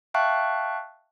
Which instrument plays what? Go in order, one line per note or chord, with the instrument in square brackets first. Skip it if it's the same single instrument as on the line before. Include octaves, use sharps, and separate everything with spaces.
[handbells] E5 F5 G5 A5 C#6 F#6